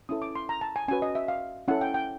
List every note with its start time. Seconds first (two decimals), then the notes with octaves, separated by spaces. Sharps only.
0.09 C#4 E4 A4 D#6
0.22 D6
0.36 C6
0.49 A#5
0.61 A5
0.76 G#5
0.88 C#4 F#4 B4 G#5
1.02 D#5
1.15 E5
1.28 F5
1.68 C#4 E4 A4 F#5
1.81 G5
1.94 G5